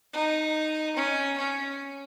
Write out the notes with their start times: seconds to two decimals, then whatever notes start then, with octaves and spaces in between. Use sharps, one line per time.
0.13 D#4
0.96 C#4
1.37 C#4